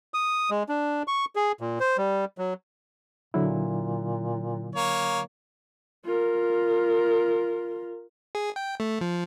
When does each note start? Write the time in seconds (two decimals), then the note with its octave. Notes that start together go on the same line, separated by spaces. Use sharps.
0.14 D#6
0.51 G#3
0.69 D4
1.08 C#6
1.36 G#4
1.61 A#2
1.80 C5
1.98 G3
2.38 F#3
3.34 A#2 D3 F#3 E4
4.75 A#3 C#5
6.05 F4 A#4
8.35 G#4
8.56 G5
8.80 A3
9.01 F3